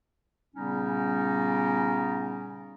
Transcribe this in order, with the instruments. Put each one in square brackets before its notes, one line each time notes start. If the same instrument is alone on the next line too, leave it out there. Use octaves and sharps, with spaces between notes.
[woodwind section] A#2 C#3 G3 B3 C#4 D#4